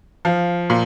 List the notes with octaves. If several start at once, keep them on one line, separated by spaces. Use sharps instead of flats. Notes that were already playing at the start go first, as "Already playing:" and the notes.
F3 F5
A#2